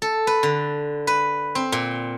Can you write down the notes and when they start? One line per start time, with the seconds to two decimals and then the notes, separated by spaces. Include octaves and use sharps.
0.02 A4
0.27 B4
0.43 D3
1.07 B4
1.55 C4
1.72 A#2